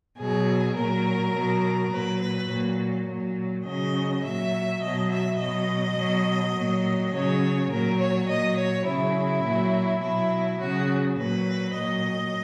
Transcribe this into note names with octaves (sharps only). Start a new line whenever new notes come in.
B2 F#3 G#4
A#2 F#3 A#4
B2 F#3
A#2 F#3 B4
B4
A#2 F#3
A#2 F#3
C#3 F#3 D#5
A#2 F#3 E5
B2 F#3 D#5
E5
B2 F#3 D#5
B2 F#3
A#2 F#3
C#3 F#3 C#5
A#2 F#3 A#4
C#5
A#2 F#3 D#5
C#5
C#3 F#3 E4
A#2 F#3
B2 F#3 E4
C#3 F#3 F#4
A#2 F#3 B4
A#2 F#3 D#5